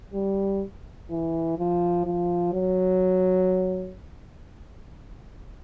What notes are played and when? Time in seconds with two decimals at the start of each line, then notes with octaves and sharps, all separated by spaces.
0.14 G3
1.10 E3
1.58 F3
2.06 F3
2.53 F#3